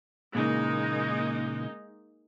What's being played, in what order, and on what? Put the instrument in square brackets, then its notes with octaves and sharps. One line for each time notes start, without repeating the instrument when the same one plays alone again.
[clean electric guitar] A#2 C#3 E3 [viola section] G#3 A#3 D#4